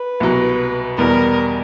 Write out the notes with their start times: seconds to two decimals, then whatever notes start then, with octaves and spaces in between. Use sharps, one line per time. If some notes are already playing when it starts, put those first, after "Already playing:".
Already playing: B4
0.20 C2 B2 F#3
0.97 E2 B2 G3 B3 A#4